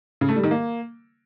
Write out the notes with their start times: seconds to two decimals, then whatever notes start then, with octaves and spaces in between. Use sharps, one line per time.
0.21 C#3
0.29 A3
0.36 G3
0.44 D#3
0.51 A#3